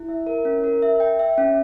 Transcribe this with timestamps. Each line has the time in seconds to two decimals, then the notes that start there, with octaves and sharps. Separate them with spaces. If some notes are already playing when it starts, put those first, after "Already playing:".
Already playing: E4
0.09 E5
0.27 A#4
0.45 C#4
0.64 A#4
0.82 E5
1.00 G5
1.19 E5
1.38 C#4